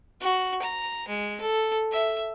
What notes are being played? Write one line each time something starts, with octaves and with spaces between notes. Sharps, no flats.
F#4
A#5
G#3
A4
E5